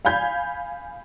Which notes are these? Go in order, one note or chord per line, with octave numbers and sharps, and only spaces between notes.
F5 G#5 B5 G6 G#6